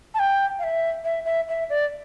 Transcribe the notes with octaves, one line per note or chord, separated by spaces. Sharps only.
A5
G5
F5
E5
E5
E5
E5
D5